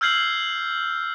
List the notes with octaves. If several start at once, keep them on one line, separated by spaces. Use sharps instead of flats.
E6 F6 G6 G#6 C7 F#7